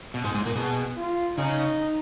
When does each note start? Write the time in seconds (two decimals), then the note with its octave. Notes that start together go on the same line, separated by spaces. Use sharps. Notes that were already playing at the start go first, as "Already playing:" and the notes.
0.14 B2
0.24 G#2 G#3
0.35 G#2 G#3
0.46 A#2 A#3
0.55 B2 B3 G#4
0.97 F4
1.38 C#3 C#4 D#4